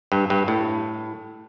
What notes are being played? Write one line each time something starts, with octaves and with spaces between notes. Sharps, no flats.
G2
G2
A2